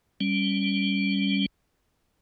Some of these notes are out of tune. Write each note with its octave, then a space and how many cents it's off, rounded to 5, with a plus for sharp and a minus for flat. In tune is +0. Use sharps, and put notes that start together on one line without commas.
G3 +0 C#4 +0